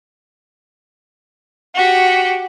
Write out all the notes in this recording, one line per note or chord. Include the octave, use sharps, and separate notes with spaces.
F#4 G4